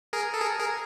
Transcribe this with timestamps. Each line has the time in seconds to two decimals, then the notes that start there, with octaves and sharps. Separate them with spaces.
0.13 G#4 A#4
0.34 A4
0.41 G#4 A#4
0.59 G#4 A#4